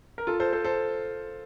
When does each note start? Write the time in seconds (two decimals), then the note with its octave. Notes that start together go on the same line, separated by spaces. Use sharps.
0.18 A#4
0.27 F4 A4
0.40 A4 C5
0.53 A4 C5
0.64 A4 C5